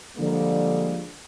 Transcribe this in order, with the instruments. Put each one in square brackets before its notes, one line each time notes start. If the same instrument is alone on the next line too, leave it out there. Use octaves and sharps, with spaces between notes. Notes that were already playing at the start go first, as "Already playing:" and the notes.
[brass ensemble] D3 F3 G3 G#3 A#3